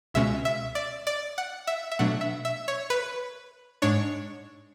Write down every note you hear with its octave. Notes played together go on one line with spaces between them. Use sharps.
C#2 B2 G#3 C#4 E5
E5
D5
D5
F#5
E5
E5
B2 F#3 A3 D4 F#5
E5
E5
C#5
B4
G#2 G#3 D4 C#5